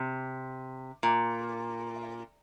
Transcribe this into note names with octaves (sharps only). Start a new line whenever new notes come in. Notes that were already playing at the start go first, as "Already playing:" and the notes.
Already playing: C3
A#2